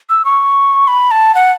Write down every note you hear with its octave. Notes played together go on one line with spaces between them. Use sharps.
E6
C#6
B5
A5
F#5